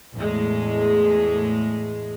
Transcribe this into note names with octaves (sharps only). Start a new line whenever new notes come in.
E2 A2 G#3